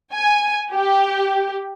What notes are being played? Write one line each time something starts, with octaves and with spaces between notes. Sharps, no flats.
G#5
G4